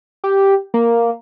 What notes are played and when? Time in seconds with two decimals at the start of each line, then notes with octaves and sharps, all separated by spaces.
0.24 G4
0.74 A#3